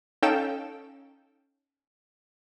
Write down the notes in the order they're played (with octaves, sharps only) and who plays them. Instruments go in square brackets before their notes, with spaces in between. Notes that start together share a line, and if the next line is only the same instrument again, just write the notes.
[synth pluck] C#4 D#4 A4 F5 G5 E7